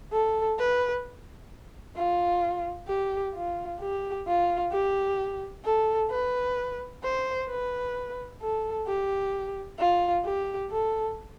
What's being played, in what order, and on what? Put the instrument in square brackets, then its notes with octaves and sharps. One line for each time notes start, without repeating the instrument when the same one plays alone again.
[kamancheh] A4
B4
F4
G4
F4
G4
F4
G4
A4
B4
C5
B4
A4
G4
F4
G4
A4